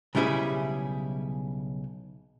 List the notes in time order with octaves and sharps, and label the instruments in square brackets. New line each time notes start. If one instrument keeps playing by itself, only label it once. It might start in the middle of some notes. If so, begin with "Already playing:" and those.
[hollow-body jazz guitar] B1 C#3 G3 E4 G#4